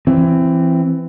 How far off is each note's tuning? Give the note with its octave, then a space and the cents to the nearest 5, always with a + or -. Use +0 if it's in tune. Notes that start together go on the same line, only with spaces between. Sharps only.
E3 +20 C4 +10